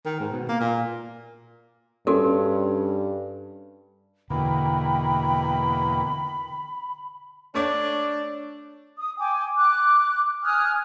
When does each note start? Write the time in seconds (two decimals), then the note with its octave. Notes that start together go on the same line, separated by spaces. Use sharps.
0.06 D#3
0.20 G#2
0.32 B2
0.49 A#3
0.60 A#2
2.07 G2 C#4 F#4 A4 A#4
4.30 E2 B2 D3 A#3 G5 B5
7.55 A3 D4 C#5 D5 D6
8.98 D#6
9.19 G5 G#5 D6
9.57 D6 F#6
10.43 G#5 D#6 F6 F#6